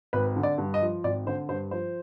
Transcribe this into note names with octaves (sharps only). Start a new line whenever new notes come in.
G#1 B4
D3
D5
G2
D#5
F3
G#1 D5
D3 C5
G2 C5
F3 C5